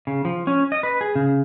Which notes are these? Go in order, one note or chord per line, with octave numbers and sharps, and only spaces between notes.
C#3
F3
C#4
D#5
B4
G#4
C#3